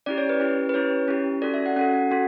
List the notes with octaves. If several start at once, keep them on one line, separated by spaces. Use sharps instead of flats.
C#4 E4 G4 D5
C#5
B4
C#4 E4 G4
B4
C#4 E4 G4 C#5
C#4 E4 G4
C#4 F#4 A4 D5
E5
F#5
C#4 F#4 A4 F#5
C#4 F#4 A4